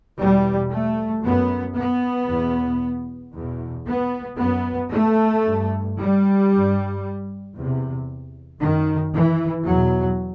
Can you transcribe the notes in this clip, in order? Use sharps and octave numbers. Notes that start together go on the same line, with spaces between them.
E2 B2 G3
A3
F#2 B3
B3
E2 B2
E2 B2
B3
F#2 B3
A3
G2
G3
G2
E2 C3
F#2 D#3
E3
E2 B2 F#3